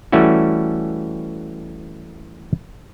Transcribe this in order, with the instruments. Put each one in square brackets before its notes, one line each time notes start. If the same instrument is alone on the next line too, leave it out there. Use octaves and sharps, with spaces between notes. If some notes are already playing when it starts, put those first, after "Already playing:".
[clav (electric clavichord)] E3 G3 A3 C#4 E4 F#4